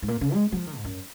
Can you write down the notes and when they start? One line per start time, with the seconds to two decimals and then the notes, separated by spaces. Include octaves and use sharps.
0.02 G#2
0.08 A#2
0.21 C#3
0.34 G#3
0.52 F#3
0.57 F3
0.67 D#3
0.76 G#2
0.85 F#2